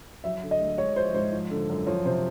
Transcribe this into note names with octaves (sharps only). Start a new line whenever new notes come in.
F#3 E5
D3
D#5
D2
G#3 C#5
F3 C5
G#2 C5
F3
D3
F#2
F3 C#5
C3 C5